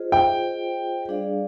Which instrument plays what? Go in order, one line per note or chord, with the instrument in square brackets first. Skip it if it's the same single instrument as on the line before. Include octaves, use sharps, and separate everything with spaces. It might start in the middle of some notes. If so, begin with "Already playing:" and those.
Already playing: [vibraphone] F4 G#4 C5 D#5
[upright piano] G5
[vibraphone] G3 D4 G#4 D5 F5